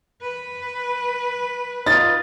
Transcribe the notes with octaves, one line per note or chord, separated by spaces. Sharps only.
B4
D#4 F4 A6